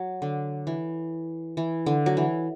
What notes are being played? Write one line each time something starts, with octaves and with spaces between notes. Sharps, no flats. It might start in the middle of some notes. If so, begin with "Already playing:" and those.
Already playing: F#3
D3
E3
E3
D3
F#3
E3